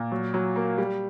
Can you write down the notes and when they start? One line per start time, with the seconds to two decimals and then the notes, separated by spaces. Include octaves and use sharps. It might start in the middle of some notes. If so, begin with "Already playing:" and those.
Already playing: A#2
0.12 F#3
0.34 F#3
0.56 A#3
0.78 G3